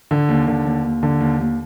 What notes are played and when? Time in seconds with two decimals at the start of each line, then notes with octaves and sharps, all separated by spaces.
0.11 D3
0.29 D#2
0.47 D3
0.65 D#2
0.84 D#2
1.03 D3
1.21 D#2
1.40 D#2